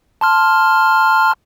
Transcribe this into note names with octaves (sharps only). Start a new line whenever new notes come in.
A5 C6 F6